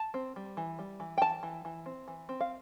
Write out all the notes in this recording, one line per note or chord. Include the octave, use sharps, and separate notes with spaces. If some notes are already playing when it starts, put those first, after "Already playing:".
Already playing: A5
C4
G3
E3
G3
E3
G5
E3 A5
E3
E3
C4
E3
C4
F5